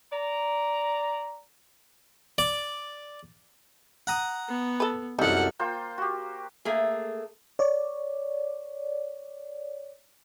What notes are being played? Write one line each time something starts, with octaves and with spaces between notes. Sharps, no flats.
D5 A#5
D5
F#5 A#5 D#6
B3
A4 B4
C2 F#2 D#4 A4 F#5
A#3 F4 C5 G5
F#4 G4
A3 A#3 G#4
C#5 D5